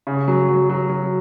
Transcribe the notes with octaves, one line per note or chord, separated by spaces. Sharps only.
C#3
F#3
F#3
F#3
F#3